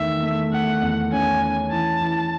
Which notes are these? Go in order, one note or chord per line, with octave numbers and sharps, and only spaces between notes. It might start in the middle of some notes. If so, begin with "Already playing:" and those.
Already playing: E2 D#3 A3 E5
A3
A3 F#5
E2
C#4 G#5
C#4
E3 A5
E3